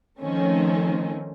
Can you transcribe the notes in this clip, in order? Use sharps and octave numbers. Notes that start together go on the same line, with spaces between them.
D#3 F3 A3 C4 C#4